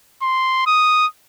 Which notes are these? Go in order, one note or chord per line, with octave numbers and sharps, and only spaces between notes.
C6
D#6